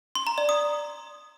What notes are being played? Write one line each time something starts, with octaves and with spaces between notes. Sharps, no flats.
C6
A#5
D5
D#6